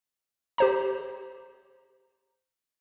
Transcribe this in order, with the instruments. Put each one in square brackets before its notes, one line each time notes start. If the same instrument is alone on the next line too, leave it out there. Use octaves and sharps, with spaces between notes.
[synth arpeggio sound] G4 C5 A#5